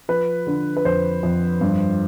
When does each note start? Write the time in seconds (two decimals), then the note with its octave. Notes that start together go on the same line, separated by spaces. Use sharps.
0.09 F3 B4
0.47 D3
0.77 B4
0.85 F2 C5
1.23 F2
1.61 G2